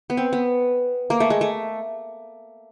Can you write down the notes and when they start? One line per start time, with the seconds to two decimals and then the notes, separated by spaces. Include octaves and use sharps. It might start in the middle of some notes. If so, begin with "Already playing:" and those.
0.10 B3
0.17 C4
0.33 B3
1.10 A#3
1.20 A3
1.30 G#3
1.41 A3